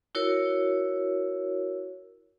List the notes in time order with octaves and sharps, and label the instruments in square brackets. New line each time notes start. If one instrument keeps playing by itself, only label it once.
[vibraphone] E4 F#4 A#4 C#5